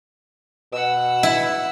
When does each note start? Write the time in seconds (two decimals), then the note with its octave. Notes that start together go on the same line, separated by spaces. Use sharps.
0.73 B2 F#5 E6
1.23 E4